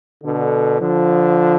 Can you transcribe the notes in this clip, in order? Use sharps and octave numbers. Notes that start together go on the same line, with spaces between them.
B2 D3
D3 F3